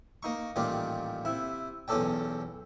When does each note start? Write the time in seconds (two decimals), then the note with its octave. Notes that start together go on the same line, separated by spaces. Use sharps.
0.23 A#3 D#4 C#6
0.56 A1 A#2 D#3 G3 F4 D5
1.25 C3 E4
1.88 B1 E2 C#4 A4 D5 G5